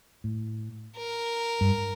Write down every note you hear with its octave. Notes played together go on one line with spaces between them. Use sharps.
A2
A#4
G2